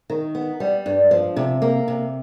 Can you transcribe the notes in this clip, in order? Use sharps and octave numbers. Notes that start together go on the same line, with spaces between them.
D#3
B3
G3
G2
F3
C3
A#3
C3